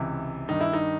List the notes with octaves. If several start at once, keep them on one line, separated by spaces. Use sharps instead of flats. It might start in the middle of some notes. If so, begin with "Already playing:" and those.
Already playing: C#2 C3 E3
G2 D#3 D#4
E4
D#4